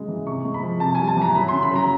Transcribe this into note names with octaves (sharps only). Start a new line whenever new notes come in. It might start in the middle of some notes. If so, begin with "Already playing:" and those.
Already playing: C#3 F#3 G#3
E3
C3 C#6
G#3
B5
F3
C3 A5
G#5
G3
A5
E3 A#5
F#3 B5
C#3 C6
B5
F#3 A#5